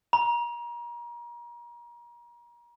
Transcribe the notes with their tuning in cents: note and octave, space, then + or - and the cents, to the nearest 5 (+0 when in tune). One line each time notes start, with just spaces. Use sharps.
A#5 +35